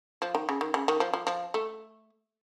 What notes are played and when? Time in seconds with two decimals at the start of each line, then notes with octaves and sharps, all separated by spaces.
0.22 F3
0.35 D#3
0.49 C#3
0.61 D#3
0.74 C#3
0.88 D#3
1.00 F3
1.13 F3
1.27 F3
1.54 A3